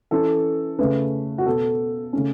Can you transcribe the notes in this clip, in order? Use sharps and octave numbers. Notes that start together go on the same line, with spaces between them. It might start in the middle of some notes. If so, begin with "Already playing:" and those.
E3 C#4 A4
C#3 A3 C#4 B4
F#4
B2 B3 A4
C#3 A3 C#4